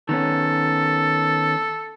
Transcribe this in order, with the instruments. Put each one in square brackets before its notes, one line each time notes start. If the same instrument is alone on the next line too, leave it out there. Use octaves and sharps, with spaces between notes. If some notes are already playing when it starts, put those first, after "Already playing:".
[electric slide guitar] D#3 B3 C#4 [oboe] A4